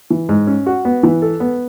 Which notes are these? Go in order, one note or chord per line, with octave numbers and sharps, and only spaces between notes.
E3
G#2
C#4
F#4
B3
E3
A4
B3